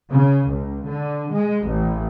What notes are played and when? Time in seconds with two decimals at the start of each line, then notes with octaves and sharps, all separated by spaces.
0.11 C#3
0.49 C#2
0.88 D3
1.33 G#3
1.66 A1